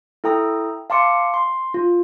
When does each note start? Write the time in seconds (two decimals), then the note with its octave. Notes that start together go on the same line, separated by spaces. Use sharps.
0.24 E4 A4 G5 A#5 D#6
0.90 F5 A5 C6 D6 C#7
1.34 C6
1.74 F4